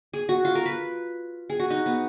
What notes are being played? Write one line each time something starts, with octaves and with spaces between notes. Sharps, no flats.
G#4
F#4
F4
A#4
B4
G#4
F#4
D#4
B3